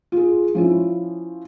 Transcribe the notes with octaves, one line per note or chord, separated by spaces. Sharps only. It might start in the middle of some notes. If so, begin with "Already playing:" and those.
F4 G#4
F3 C#4 E4